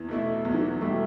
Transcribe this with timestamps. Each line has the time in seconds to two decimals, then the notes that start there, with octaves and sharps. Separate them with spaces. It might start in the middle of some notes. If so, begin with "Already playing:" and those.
Already playing: E2 E3
0.08 B2 A3 E4
0.45 E2 F#3
0.54 E3
0.61 F#3
0.81 B2 G3 A3 E4